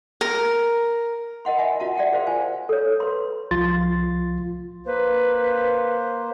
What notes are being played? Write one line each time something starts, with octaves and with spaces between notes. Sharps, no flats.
A#4
A#4 D#5 F#5 C6
D#5 E5 F#5 G#5 B5
F4 F#4 F#5 A5
D5 E5 F#5 G5 A5
F#4 G#4 A#4 C5 F5 C6
F4 C5 G#5
A4 C#5
B4 C6
C2 F3 F4 C6 A6
A#3 B4 C5